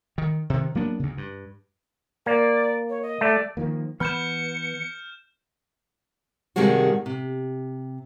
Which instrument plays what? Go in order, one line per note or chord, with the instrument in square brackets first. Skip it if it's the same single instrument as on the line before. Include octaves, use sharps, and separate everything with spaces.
[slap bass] D#3
C3 D#3
F#3 A#3 B3 D4
D2 C#3
G2
[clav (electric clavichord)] A#3 [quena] D5
[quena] C#5
D#5
[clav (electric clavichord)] A3 [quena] D5
[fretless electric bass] D#3 F3 A#3
[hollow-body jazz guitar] E3 B5 [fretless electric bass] B3 [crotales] F6 G6 E7 [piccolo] C#7
[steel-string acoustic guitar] G2 C3 D#3 G3 G#3 F#4
C3